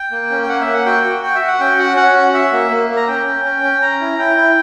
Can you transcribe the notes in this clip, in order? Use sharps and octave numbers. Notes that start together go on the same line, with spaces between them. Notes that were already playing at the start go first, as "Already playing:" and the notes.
Already playing: G5
A#3
C#4
G5
A#3 F#5
E5
A#3
F#5
F#4 G5
F#4
F#4 G5
E5
F#4
F#5
C#4 G5
F#4 F#5
C#4 F#5
F#4
F#4 E5
A#3
A#3
A#3
A#5
C#4 G5
C#4
C#4
C#4
C#4 A#5
E4
E4 G5
E4